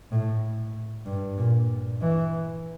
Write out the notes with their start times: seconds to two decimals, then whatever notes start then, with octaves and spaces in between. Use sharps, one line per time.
0.12 A2
1.06 G2
1.38 A#2
2.01 E3